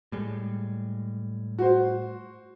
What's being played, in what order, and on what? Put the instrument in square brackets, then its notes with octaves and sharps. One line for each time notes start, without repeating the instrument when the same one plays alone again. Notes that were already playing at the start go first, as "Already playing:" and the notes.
[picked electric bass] A2 G3 G#3
[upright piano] F#4 C5